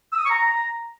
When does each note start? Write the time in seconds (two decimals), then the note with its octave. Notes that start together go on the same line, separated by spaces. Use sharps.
0.13 E6
0.19 D#6
0.24 C#6
0.30 A#5